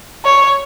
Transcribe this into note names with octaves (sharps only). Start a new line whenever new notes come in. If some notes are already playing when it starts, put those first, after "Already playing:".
C#5